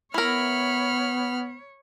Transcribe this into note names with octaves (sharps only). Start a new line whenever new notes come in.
B3 E4 A#4 C#5 B5 F6